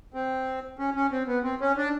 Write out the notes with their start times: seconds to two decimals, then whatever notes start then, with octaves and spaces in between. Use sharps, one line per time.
0.14 C4
0.79 C#4
0.95 C#4
1.12 C4
1.27 B3
1.43 C4
1.61 C#4
1.77 D4